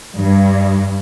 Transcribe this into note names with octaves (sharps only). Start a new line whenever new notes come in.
G2